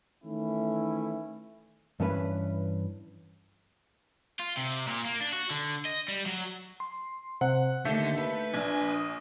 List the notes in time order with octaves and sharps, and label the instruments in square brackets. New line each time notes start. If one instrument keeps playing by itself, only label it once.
[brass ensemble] D#3 E3 A3 C#4 E4
[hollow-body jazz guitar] G2 E3 C#4 B4
[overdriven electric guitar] F4
C3
A#2
A#3
D4
F#4
D3
D#5
G3
F#3
[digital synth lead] C6
[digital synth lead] C3 [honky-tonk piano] F#5
[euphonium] D#2 [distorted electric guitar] D3 [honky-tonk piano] A3 [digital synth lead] G6
[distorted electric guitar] B4
[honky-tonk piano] A#1 [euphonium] D4 [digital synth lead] G#5
[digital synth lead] D#6